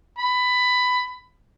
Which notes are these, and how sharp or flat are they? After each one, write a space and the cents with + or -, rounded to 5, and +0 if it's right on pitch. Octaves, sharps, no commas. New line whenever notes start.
B5 +15